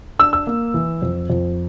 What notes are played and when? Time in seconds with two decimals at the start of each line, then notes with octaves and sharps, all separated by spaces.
0.19 D4 E6
0.33 E6
0.47 A#3
0.74 E3
1.02 F2
1.30 F2